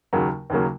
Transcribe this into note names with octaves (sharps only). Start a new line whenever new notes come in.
D#2 C#3 F#3 A#3
D#2 C#3 F#3 A#3